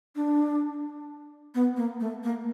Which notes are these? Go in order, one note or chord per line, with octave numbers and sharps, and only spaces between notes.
D4
B3
A#3
A3
A#3